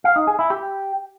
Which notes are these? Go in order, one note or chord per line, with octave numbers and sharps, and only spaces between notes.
F5
D#4
G#4
E4
G4